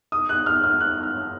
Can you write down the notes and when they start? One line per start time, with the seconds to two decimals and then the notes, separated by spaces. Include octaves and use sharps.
0.12 D#6
0.29 F#6
0.46 F6
0.64 F6
0.81 F#6
1.03 F6